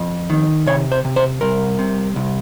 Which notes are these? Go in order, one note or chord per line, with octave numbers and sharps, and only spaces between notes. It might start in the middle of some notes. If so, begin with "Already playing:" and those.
Already playing: F2
D#3
C3 C#5
C5
C3
C5
C2 A#4
C3
C2